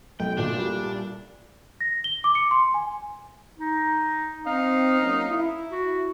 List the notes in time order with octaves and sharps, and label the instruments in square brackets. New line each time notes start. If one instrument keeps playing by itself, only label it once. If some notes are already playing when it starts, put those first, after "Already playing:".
[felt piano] B1 [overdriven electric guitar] G5
[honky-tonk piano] A#2 A3 [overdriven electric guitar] D4
[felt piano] G3
[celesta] A#6
G7
D6
C#7
C6
G#5
[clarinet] D#4
[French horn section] C4 [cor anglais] D#4 [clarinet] F5
[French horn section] F#3 A#3 C#4
E4
[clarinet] F#4